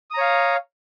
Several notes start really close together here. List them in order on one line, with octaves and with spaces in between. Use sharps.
D#6 A#5 C#5 F5